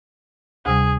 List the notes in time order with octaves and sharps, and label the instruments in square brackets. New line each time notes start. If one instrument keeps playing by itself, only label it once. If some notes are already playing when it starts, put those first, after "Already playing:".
[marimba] D2 C3 G3 [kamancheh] G#4